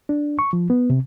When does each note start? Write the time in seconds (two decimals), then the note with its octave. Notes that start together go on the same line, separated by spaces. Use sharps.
0.09 D4
0.39 C#6
0.53 F3
0.70 B3
0.90 C3